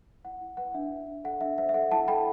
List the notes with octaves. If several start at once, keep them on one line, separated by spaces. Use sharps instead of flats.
E4 F#5
E4
B4 F#5
D4 E5
D4
D4
A4 F#5
D4 E5
C5 E5
E5
A4 F#5
E4 F#5 A5
A4 G5 B5